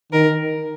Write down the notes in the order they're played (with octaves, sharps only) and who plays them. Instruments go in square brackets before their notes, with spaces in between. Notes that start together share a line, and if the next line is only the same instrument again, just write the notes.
[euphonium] D#3 [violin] A#4